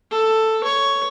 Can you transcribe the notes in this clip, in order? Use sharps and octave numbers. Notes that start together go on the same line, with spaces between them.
A4
C#5